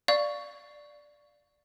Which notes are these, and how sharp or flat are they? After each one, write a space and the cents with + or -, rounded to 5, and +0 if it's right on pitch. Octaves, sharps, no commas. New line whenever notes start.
D5 +0 F5 +0 C#6 +10